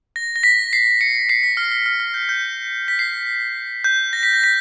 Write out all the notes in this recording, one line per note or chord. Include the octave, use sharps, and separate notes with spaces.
A#6
A#6
B6
C7
C#7
C7
B6
F6
F6
F6
F6
G6
G6
B6
C7
G6
A#6
B6
A#6
B6